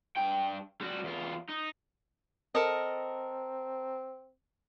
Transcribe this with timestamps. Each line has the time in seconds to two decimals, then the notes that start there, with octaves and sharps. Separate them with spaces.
0.17 G2 G5
0.81 G3 F#4
1.04 E2 F4
1.49 D#4
2.55 C4 A4 A#4 D#5